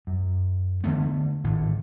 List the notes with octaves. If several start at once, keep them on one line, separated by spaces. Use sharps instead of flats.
F#2
D3 E3 A3 B3
G#1 A2 D3